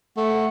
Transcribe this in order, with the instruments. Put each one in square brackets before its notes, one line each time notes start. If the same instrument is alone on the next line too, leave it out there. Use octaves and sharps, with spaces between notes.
[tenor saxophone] A3 [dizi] F#5